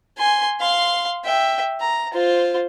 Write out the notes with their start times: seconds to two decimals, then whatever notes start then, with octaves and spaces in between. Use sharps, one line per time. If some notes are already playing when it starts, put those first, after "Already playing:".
0.18 G#5 C6
0.60 F5 C6
1.24 E5 G5
1.80 A#5
2.13 F4 C5